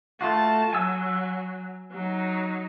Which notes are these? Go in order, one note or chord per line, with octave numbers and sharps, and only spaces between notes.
A3 F4 F#4 A5
F#3 G#5 E6
F#3 D#4